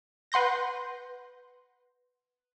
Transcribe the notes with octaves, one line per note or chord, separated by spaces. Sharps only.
B4 F#5 C6 G6 A#6